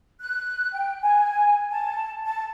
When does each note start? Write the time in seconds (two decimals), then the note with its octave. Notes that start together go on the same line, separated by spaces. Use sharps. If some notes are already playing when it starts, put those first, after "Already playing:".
0.20 F#6
0.73 G5
1.01 G#5
1.70 A5
2.25 A5